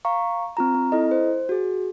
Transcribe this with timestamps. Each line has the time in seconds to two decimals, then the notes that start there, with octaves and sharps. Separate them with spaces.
0.05 F5 A#5 C#6
0.57 C4 F4 A#5
0.74 C4
0.92 E4 A4 D#5
1.11 C5
1.49 F#4 G#4